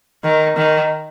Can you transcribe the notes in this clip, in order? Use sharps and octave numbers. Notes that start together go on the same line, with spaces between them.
D#3
D#3